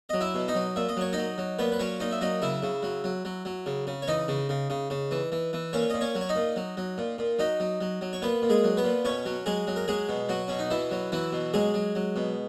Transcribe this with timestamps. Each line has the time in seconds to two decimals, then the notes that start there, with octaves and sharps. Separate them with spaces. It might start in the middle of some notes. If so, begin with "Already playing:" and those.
0.09 F#3 D#5
0.21 E4 E5
0.35 B2
0.48 D#4 D#5
0.55 F#3
0.76 A#2 E5
0.89 D#5
0.97 F#3 C#5
1.13 F#3 D#4 D#5
1.38 F#3
1.59 A#2 B3 B4
1.72 B4
1.79 F#3 C#4 C#5
2.00 A#2 D#4 D#5
2.11 E5
2.21 F#3 D#4 D#5
2.42 C#3 E4 E5
2.63 C#3
2.83 F#3
3.04 F#3
3.25 F#3
3.45 F#3
3.66 C#3
3.87 C#3
4.02 C#5
4.08 E3 D#4 D#5
4.28 C#3
4.49 C#3
4.70 C#3
4.90 C#3
5.11 E3
5.32 E3
5.53 E3
5.73 A#2 C#4 C#5
5.90 A#2 D#5
6.01 C#4 C#5
6.15 F#3
6.21 C#5
6.29 D#4 D#5
6.36 A#2
6.56 F#3
6.77 F#3
6.98 A#2
7.18 A#2
7.39 F#3 D#4 D#5
7.60 F#3
7.81 F#3
8.01 F#3
8.13 C#5
8.22 A#2 B3 B4
8.42 A#2
8.49 G#3 G#4
8.64 F#3
8.77 B3 B4
8.84 A#2
9.05 B2 C#4 C#5
9.26 F#3
9.46 F#3 G#3 G#4
9.67 F#3
9.76 A#4
9.88 F#3 G#3 G#4
10.09 B2
10.29 F#3 F#4
10.48 B2 C#4
10.59 D#4
10.70 B2 E3 E4
10.91 F#3
11.12 E3 F#3 E4
11.33 B2
11.54 F#3 G#3 G#4
11.74 F#3
11.95 F#3
12.16 B2